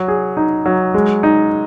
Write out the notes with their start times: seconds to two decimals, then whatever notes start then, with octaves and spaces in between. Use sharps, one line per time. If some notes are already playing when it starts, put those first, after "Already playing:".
Already playing: F#3
0.08 G#4
0.37 D#4
0.66 F#3
0.94 G#3
1.23 D#4